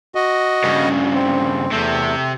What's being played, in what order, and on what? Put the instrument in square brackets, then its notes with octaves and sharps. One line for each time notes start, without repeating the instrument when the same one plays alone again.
[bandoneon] F#4 D#5
[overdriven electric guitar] G2 C#3
[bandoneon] C4
[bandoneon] E2 A3 [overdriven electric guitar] C3 C4